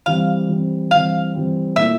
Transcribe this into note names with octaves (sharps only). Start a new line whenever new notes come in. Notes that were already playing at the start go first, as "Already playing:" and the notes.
E3 G3 C4 F5
E3 G3 C4
E3 G3 C4 F5
E3 G3 C4
A#2 A3 E4 E5